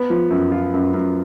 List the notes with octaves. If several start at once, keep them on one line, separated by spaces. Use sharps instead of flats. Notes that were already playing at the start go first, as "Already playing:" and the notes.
Already playing: B3
F3
F#2
F4
F#2
F#2